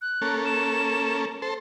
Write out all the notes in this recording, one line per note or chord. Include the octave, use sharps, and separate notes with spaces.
F#6
A#3 C#4 A4
E7
A4 C5